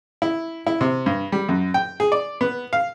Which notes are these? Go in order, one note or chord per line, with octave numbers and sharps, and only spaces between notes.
E4
E4
C3
G2
G3
F#2
G5
G#4
D5
B3
F5